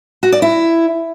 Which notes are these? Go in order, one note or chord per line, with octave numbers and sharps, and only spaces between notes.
F#4
D5
E4